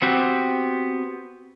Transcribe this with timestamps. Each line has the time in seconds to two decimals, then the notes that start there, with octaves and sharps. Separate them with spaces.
0.02 B3 C4 F#4 G4